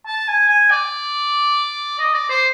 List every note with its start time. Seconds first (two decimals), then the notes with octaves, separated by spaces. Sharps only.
0.07 A5
0.28 G#5
0.49 G#5
0.71 D5
1.99 D#5
2.14 D5
2.30 C5